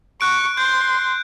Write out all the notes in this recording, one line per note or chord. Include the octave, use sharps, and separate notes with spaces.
C#6 F#6 D7
C6 G6